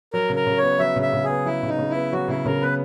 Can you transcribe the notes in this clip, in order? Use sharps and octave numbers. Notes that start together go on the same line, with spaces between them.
F#3 A#4
C#3
A#4
C#3
C#5
B3
F#3 E5
C#3
E5
C#3
G#4
B3
F#3 E4
C#3
D#4
C#3
E4
B3
F#3 F#4
C#3 E4
C#3 A#4
B3 B4